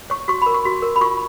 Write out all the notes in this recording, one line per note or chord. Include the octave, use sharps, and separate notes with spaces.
C#5 C#6
F#4 C#6
A#4 B5
C#6
F#4
A#4
B5
F4 C#6